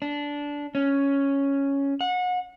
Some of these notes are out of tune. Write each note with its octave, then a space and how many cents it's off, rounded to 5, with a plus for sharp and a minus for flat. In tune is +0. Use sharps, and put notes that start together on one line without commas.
D4 -15
C#4 +0
F#5 -30